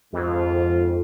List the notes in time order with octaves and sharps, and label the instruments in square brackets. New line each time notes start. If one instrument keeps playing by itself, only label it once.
[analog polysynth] F2 [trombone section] G#2 F4